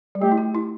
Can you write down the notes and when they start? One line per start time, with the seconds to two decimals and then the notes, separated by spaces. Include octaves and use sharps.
0.15 G3
0.22 A3 G4
0.32 E4
0.38 G4
0.55 E4